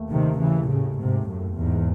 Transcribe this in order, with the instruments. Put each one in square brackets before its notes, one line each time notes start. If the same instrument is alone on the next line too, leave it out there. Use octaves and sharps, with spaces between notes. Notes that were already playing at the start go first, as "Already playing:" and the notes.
Already playing: [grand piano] D#2 A3
[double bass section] C3 D#3
C#3 E3
A2 C#3
G#2 C3
F#2 A2
E2 G#2